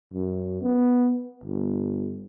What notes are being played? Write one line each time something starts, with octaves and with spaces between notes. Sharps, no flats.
F#2
B3
G1